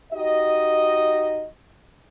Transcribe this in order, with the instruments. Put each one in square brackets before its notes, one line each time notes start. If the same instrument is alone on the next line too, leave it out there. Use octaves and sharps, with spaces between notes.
[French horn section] D#4 F#4 G4 D#5